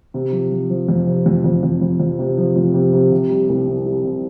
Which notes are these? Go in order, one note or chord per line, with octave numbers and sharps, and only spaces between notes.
C3
F3
F3
F3
F2
C3
F2
F2
F2
F2
F2
C3
F3
F2
C3
C3
C3
G3
C2
C3
G3
C3